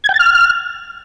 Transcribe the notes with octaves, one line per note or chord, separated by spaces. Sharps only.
G#6
G5
A6
F6